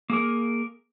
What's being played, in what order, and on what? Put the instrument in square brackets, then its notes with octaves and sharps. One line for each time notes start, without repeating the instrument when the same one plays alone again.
[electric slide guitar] A#3 G#4 A#4